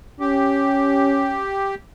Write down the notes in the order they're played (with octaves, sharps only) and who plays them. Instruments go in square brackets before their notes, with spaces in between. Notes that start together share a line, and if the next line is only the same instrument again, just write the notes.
[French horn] C#4 [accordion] G4